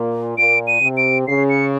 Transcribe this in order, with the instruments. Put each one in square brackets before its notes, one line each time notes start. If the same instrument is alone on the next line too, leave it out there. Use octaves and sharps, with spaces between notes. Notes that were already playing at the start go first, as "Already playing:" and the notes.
Already playing: [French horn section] A#2
[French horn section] A#2 [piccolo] D7
[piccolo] D#7
[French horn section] C3
[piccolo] D7
[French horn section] C#3 [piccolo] C7
[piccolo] C#7